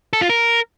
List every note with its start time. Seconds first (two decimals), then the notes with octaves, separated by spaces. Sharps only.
0.13 A4
0.21 F4
0.29 A#4